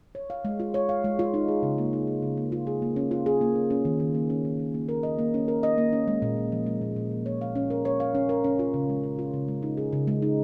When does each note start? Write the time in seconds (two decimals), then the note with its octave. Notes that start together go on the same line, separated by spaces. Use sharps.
0.15 C#5
0.30 F5
0.45 G#3
0.60 F4
0.74 C#5
0.89 F5
1.04 G#3
1.19 F4
1.34 D#4
1.48 G#4
1.63 C#3
1.78 A#3
1.93 D#4
2.07 G#4
2.22 C#3
2.37 A#3
2.52 F4
2.67 G#4
2.82 A#3
2.96 C#4
3.11 F4
3.26 G#4
3.41 A#3
3.55 C#4
3.70 C#4
3.85 D#3
4.00 D#3
4.15 A#3
4.30 C#4
4.45 D#3
4.59 D#3
4.74 A#3
4.89 A#4
5.03 D#5
5.19 A#3
5.34 C#4
5.48 A#4
5.63 D#5
5.78 A#3
5.93 C#4
6.08 G#3
6.22 A#2
6.37 A#2
6.52 F3
6.66 G#3
6.81 A#2
6.96 A#2
7.11 F3
7.26 C#5
7.41 F5
7.55 C#4
7.70 A#4
7.85 C#5
8.00 F5
8.15 C#4
8.29 A#4
8.44 C#4
8.59 F4
8.74 C#3
8.89 G#3
9.03 C#4
9.19 F4
9.34 C#3
9.48 G#3
9.63 D#4
9.77 G#4
9.93 C#3
10.07 G#3
10.22 D#4